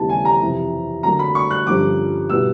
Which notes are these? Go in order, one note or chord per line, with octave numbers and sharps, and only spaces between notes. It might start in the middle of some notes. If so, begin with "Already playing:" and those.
Already playing: D#2 C#3 E3 G3 B3 A5
G#5
A#5
F2 C3 E3
D3 F#3 A#3 A#5
B5
C#6
F#6
G2 D3 F3 A#3 C#4 D6
B2 G3 B3 E4 E6